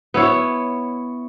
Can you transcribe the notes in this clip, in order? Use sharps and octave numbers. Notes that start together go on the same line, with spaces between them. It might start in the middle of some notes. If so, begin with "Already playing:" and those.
B3 E4 C#5